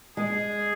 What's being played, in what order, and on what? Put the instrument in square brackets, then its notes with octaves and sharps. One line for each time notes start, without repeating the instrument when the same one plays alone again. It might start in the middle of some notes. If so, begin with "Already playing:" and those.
[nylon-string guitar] G#3 [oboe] G#4